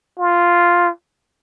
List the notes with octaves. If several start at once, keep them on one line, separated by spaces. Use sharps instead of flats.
F4